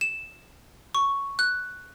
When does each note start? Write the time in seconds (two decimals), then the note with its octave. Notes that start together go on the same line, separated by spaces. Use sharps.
0.01 E7
0.95 C#6
1.39 F#6